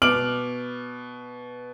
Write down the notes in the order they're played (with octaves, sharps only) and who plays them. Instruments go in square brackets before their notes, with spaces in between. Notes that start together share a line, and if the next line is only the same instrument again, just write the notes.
[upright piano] B2 D6 F6 D7 F#7